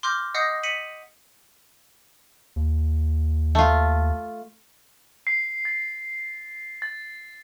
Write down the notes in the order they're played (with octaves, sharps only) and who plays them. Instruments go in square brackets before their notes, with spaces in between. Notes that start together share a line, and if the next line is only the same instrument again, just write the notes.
[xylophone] C6 D6 F6 G6 A#6
D#5 F#5 D#6 G6 A#6 C7
B6 C#7 D#7 F#7
[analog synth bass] D#2
[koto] A3 F4
[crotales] C7
A6
A6